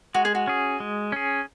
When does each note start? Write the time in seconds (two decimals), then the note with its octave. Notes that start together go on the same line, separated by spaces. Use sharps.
0.14 G#3 F#4
0.25 G#4
0.35 F#4
0.47 C#4 G#4
0.80 G#3
1.12 C#4 G#4